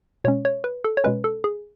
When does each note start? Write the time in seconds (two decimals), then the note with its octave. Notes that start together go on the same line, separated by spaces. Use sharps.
0.24 B2 G#3 C#4 C#5
0.45 C#5
0.64 B4
0.84 A4
0.97 C#5
1.04 B2 G#3 C#4 B4
1.24 A4
1.44 G#4